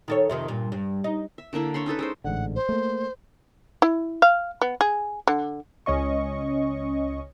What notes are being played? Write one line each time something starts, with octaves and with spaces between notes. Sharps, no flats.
D#3 A4 C#5
F2 C3 D#3
G2 A#2
G2
D#4
E5
D3 A#3 D4 E4
D4 C#5 B5 C6
C#4 D#4 A4 B4
G#3 A4 C5
A1 G#2 D3 F#5
C5
A3 A#3
E4
F5
B3
G#4
D3
C#2 C#4 D#5 C#6